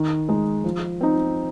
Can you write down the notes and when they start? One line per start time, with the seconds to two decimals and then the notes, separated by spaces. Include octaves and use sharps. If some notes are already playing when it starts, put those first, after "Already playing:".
Already playing: D#3
0.29 G#3 D#4
0.64 F3
1.01 C4 D#4